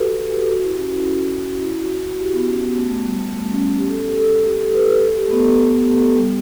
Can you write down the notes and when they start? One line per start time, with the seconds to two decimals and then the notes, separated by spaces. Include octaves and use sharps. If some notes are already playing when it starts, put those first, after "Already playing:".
Already playing: F#4 G4 A4 B4
0.11 B4
0.30 A4
0.49 F#4
0.64 E4
0.78 C#4
0.92 E4
1.63 E4
1.81 F#4
2.01 F#4
2.19 G4
2.33 B3
2.48 C#4
2.62 B3
2.76 A3
2.90 A3
3.04 G3
3.19 A3
3.33 A3
3.52 C#4
3.78 G4
3.89 A4
4.17 A4
4.46 G4
4.60 A4
4.74 B4
4.88 B4
5.03 A4
5.17 G4
5.27 A3
5.31 B3
5.45 B3
6.16 G3